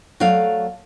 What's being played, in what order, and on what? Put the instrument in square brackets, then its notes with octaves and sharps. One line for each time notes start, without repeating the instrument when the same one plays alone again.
[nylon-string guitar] F#3 A3 D5 F5